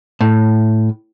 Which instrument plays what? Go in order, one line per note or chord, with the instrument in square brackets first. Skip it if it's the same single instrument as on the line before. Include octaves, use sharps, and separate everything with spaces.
[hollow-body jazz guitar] A2